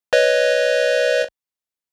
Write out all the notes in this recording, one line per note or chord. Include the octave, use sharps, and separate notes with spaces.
B4 C#5 D#5